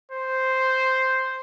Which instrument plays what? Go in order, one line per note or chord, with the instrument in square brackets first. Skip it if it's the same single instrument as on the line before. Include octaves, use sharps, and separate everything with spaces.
[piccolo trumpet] C5